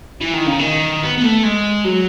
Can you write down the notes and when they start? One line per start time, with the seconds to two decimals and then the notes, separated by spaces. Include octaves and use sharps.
0.21 E3
0.33 D#3
0.47 C#3
0.59 D#3
1.03 B3
1.18 B3
1.23 A3
1.43 G#3
1.85 F#3